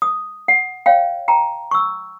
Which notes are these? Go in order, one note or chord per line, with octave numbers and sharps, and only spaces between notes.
D#6
F#5
C#5 F5 G5
G5 A5 A#5
C#6 E6